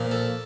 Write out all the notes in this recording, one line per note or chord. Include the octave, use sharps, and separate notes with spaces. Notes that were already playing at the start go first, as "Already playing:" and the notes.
Already playing: A#2 F3
A4